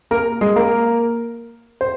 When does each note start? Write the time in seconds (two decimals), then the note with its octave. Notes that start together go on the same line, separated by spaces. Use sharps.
0.11 A#3 A#4
0.41 G#3 G#4
0.56 A#3 A#4
1.81 C5